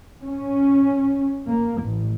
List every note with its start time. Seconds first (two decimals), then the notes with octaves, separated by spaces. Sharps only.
0.24 C#4
1.48 A#3
1.82 A1